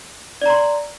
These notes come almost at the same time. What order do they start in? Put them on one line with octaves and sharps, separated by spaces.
D5 A#5 C6